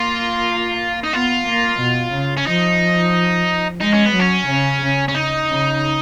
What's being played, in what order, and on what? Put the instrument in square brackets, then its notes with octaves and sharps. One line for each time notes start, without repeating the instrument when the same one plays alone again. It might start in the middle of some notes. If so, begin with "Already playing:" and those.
Already playing: [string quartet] A#3 [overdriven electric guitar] F4
[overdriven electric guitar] D#4
[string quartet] B3 [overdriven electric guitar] F4
[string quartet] A#3
B2
C#3
[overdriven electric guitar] C#4
[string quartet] F3 [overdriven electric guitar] D#4
[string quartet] G#3 [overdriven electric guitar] D#4
[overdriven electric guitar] C#4
B3
[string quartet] F#3
[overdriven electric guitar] C#4
[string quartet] C#3
C#3
[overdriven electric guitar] C#4
D#4
[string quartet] C#3